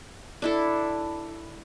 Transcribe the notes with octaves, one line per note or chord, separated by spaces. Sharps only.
D4 E4 A4